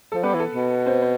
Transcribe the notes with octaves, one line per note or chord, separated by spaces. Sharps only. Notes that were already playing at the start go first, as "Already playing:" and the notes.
F3 A4
G3 B3 B4
E3
A4
B2
C4 C5
C5